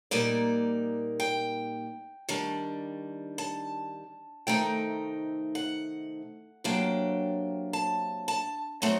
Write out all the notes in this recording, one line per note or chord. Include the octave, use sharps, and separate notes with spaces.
A#2 G3 A#3 D#4 D5
G5
D#3 G3 D4
A5
C3 D#3 A3 D#4 G5
F#5
C3 F#3 A#3 D4 G5
A5
A5
F#3 A3 C4 D#4 F#5